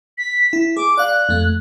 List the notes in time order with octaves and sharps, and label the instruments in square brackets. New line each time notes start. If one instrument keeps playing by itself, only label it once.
[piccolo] B6
[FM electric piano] E4
[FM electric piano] G#4 [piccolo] D6
[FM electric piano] D5 F5 [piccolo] F#6
[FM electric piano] F2 A3